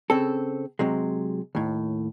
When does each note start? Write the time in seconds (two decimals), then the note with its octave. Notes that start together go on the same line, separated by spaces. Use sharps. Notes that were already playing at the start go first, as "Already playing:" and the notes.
0.10 C#3 C4 A4
0.79 C3 F#3 G#3
1.55 D#2 A2